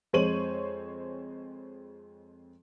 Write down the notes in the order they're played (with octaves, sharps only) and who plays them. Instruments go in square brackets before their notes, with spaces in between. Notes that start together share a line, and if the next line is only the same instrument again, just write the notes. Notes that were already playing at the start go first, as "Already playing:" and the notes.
[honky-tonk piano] F2 G#3 C5 C#5 D#7 F#7